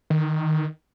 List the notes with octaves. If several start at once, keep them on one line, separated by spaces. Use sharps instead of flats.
D#3